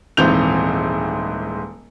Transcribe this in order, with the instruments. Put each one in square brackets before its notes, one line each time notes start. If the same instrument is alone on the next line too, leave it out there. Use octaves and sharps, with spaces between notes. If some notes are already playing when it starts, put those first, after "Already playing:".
[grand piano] D#1 G#2 E3 C4 G6 F7